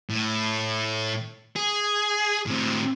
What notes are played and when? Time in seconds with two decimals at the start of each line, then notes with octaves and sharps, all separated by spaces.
0.10 A2
1.56 G#4
2.46 A2 C4